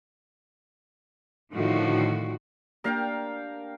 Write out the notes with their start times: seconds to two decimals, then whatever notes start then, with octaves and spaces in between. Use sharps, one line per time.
1.52 A2 D3 D#3 F3 F#4
2.84 A#3 D4 G4 A#4 F5 G5